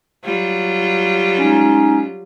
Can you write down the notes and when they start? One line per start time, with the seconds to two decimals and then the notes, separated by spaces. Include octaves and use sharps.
0.25 F#3 G3 F4
1.39 G#3 C#4 D#4